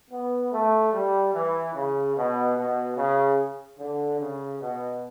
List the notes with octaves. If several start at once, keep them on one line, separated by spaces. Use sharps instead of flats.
B3
A3
G3
E3
C#3
B2
B2
C#3
D3
C#3
B2